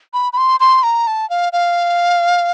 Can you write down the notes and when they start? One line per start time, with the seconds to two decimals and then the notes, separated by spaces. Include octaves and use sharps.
0.14 B5
0.33 B5
0.38 C6
0.60 C6
0.83 A#5
1.07 A5
1.30 F5
1.53 F5